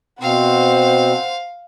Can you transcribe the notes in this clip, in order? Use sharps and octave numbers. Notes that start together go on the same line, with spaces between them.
B2 C4 C5 F5 F#5